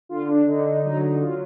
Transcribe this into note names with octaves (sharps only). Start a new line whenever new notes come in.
D3 F4
D4
D3 D#4
D#4
F#3 D#4
D#4
F#3 F4